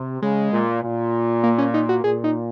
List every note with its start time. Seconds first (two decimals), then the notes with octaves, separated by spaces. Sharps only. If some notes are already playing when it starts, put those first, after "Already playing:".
Already playing: C3
0.22 C#3 G#3
0.53 A#2
0.83 A#2
1.44 A#3
1.58 C#4
1.74 D#4
1.89 F#4
2.04 A#2 G#4
2.24 D#4